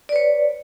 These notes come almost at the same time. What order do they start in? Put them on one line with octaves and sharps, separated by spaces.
D5 B4 C#5